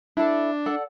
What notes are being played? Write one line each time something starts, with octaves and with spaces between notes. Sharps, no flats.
D4 E4 A4
A4 D5 F#5